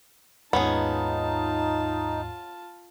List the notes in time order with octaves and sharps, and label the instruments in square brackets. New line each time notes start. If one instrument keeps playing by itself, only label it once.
[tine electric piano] D#2 G#2 [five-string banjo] B3 C#4 G#4 [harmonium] D#4 [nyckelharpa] F4 A5